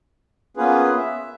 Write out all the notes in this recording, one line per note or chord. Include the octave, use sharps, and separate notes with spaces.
A#3 B3 C#4 F4 G#4 B4
E5